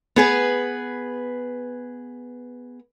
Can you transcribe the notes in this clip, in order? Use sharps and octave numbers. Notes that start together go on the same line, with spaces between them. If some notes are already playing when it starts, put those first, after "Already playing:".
B3 G#4 B4